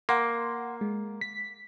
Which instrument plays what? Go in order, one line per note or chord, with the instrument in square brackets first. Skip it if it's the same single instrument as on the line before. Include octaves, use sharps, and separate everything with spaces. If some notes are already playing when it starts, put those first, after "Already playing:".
[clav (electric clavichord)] A#3 [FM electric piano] F#5 C6
[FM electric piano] G#3
B6